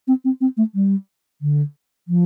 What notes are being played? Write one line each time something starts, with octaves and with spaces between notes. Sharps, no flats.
C4
C4
C4
A3
G3
D3
F3